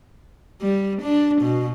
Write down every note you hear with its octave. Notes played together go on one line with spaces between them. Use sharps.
G3
D4
B2